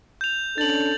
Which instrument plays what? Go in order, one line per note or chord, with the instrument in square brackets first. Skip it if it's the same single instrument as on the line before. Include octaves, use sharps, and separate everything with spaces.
[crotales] G6 F7
[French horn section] C#4 D4 A4 [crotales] A6 F#7